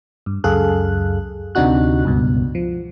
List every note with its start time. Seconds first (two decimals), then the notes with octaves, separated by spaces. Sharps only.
0.26 G2
0.44 C#2 F#2 G#4 A4 F5 F#6
1.55 D2 C3 D4 D#4 F#4 F#6
2.05 C#2 G2 B2
2.55 F3